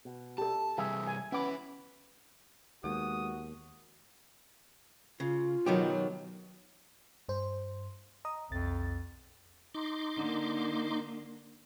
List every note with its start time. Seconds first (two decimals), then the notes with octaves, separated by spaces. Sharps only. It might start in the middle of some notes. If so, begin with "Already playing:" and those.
0.05 B2
0.38 G4 A4 A5
0.78 C3 E3 G3 G#4 E5
1.07 G#5
1.32 B3 C#4 E4 B4 D6
2.84 D#2 G#3 B3 F#4 D#6
5.20 C#3 F4
5.66 B2 D#3 F#3 G4
7.29 G2 C5
8.25 D#5 A#5 D#6
8.50 B1 F2 A6
9.75 D#4 C6 D6
10.17 D3 A#3